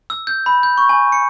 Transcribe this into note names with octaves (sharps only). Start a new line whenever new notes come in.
E6
G6
B5
G6
C#6
G#5
C#7